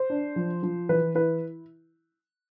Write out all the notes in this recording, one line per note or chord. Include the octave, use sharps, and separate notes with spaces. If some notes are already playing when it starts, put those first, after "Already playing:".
Already playing: C5
D4
F3
F3
E3 B4
E4 B4